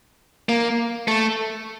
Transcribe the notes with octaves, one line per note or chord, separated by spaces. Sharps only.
A#3
A3